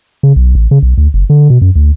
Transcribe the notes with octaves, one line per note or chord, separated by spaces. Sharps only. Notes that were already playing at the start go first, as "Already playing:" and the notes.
C#3
B1
A1
C#3
B1
D2
F#1
D3
B2
F#2
D2